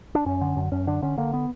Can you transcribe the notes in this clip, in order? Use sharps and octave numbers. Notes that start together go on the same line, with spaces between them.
D4
F#2 C#4
D3
F#2
F#2 C#4
D3 D4
D3 C#4
D3 A#3
B3